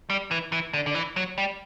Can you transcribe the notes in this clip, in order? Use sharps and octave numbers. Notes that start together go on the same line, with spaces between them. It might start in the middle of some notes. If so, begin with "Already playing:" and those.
G3
E3
E3
D3
D3
E3
F#3
G3